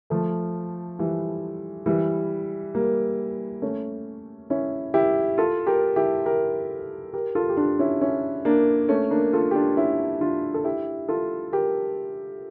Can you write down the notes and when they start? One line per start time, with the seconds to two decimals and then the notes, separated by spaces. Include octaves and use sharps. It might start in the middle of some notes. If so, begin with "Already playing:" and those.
0.10 F3 A3
0.99 E3 G3
1.86 E3 G3
2.74 G3 A#3
3.62 A3 C#4
4.50 C#4 E4
4.94 E4 G4
5.38 F4 A4
5.67 G4 A#4
5.96 E4 G4
6.26 G4 A#4
7.14 G4 A#4
7.35 F4 A4
7.49 G4
7.57 D4 F4
7.79 C#4 E4
8.01 C#4 E4
8.45 A#3 D4
8.89 A3 C#4
9.11 A#3 D4
9.33 F4 A4
9.51 G4
9.55 D4 F4
9.77 C#4 E4
10.21 D4 F4
10.54 A4
10.64 E4 G4
11.08 F4 A4
11.52 G4 A#4